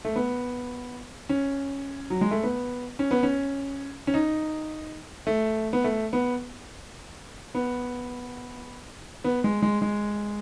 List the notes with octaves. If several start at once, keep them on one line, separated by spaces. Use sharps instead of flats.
A3
B3
C#4
F#3
G#3
A3
B3
C#4
B3
C#4
C#4
D#4
A3
B3
A3
B3
B3
B3
G#3
G#3
G#3